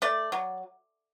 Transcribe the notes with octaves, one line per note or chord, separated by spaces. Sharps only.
A3 D5
F#3